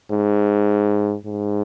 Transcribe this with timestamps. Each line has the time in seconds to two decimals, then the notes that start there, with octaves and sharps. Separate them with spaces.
0.11 G#2
1.26 G#2